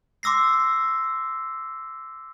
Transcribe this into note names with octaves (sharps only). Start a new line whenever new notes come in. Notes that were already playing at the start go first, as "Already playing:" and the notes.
C6 D6 E6 A#6 C7